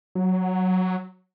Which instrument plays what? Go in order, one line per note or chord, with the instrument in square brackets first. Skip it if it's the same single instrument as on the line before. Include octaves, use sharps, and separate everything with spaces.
[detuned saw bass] F#3